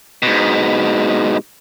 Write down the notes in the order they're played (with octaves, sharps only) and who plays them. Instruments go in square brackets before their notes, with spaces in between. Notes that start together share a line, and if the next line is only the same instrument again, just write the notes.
[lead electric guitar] G#2 B2